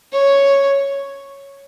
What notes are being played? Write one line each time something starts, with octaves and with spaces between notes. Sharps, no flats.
C#5